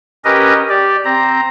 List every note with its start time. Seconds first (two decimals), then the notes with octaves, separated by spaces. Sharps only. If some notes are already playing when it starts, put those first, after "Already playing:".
0.25 C#4 G4 A#4 B4 D#5
0.69 G4 D5
1.05 C4 A#5